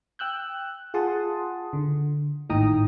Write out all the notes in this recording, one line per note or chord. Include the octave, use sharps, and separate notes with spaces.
G5 E6 F#6 G6
F4 G#4 F#5 A5 C6 D#6
D3
G#1 A2 D#4 G5 A#5 D#6